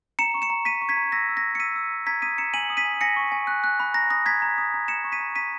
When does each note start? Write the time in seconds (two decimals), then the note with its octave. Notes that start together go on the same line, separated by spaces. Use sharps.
0.19 A#5 C#7 E7
0.34 C#6
0.42 C#7 E7
0.50 A#5
0.65 A#5 B6 D#7
0.82 C#6
0.89 G#6 B6
0.97 A#5
1.12 E6 A#6
1.29 E6
1.37 A#6
1.44 A#5
1.55 C#7
1.59 E6 B6 D#7
1.76 E6
1.91 A#5
2.07 A#5 G#6 B6
2.22 D#6 B6 D#7
2.38 A#5 C#7 E7
2.54 G#5 D#7 F#7
2.70 D#6
2.77 B6 D#7
2.85 G#5
3.01 G#5 A#6 C#7
3.16 C#6
3.32 G#5
3.47 F#6
3.64 F#6
3.80 B5
3.94 A#5 A#6
4.10 D#6 A#6
4.26 A#5 G#6 B6
4.42 A#5
4.58 D#6
4.74 A#5
4.88 A#5 C#7 E7
5.04 C#6
5.12 B6 D#7
5.20 A#5
5.35 A#5 B6 D#7